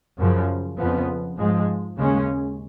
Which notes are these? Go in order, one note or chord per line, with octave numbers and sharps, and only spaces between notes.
F#2 C#3 F3
F2 C#3 F3 B3
G#2 F3 G#3
D#2 C#3 G#3 C#4